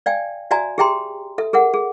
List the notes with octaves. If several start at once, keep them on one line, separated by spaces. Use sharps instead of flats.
D5 F5 G5 G#5
F#4 D5 E5 G#5 A#5
G4 G#4 E5 G5 A#5 C6
A4 E5
G#4 A#4 E5 F#5
G#4